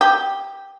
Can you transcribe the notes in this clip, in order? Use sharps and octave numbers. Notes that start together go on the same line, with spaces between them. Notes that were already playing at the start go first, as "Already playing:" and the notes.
G4